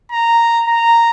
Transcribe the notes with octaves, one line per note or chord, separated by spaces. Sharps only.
A#5
A#5